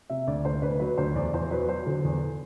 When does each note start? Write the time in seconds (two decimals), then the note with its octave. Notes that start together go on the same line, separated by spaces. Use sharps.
0.10 C3 E5
0.27 D2 D5
0.45 D2 C5
0.62 D2 B4
0.80 F#3 B4
0.98 D2 C5
1.15 E2 D5
1.33 E2 C5
1.50 F#3 B4
1.68 F#3 C5
1.86 D3
2.05 E2